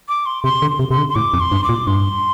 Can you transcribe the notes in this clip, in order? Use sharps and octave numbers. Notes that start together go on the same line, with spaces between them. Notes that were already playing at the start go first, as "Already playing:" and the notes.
D6
C6
C3 C6
D3
C3
C3 C6
D3
C6
A2 D6
F2
C6
G2
D6
A#2
G2 C6